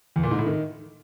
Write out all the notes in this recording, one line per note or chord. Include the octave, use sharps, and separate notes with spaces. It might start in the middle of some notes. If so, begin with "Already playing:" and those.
E2
A#2
G#2
A2
D#3